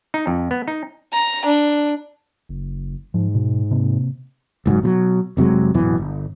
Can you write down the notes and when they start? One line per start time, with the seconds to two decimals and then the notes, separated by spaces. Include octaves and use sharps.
0.14 D#4
0.27 F2
0.51 B3
0.68 D#4
1.13 A#5
1.45 D4
2.49 F#1
3.14 G#2 F3
3.35 B2
3.71 C3 A#3 C4
4.65 F#1 G#2 D#3 F#3
4.83 B2 F3 F#3
5.37 F1 C3 F#3 G#3
5.74 D1 F#2 B2 E3
5.98 G1